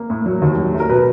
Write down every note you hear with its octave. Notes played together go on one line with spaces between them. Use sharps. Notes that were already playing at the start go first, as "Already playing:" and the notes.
Already playing: A#3
A2
F#3
D#2
F#3
A3
A#4
B2 B4